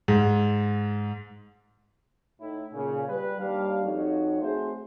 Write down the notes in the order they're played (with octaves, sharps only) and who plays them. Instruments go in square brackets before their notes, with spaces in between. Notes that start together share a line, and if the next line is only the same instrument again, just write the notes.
[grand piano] G#2
[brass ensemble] A2 D#4 E4
A#2 C#3
G3 B4
D#2 G3 D4 F5
F2 D#4 F#4 C#5
A3 C4 F#4 G#4 C5